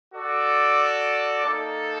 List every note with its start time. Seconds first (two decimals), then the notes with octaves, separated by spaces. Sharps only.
0.14 F#4 A4 D5
1.43 A#3 D#4 A4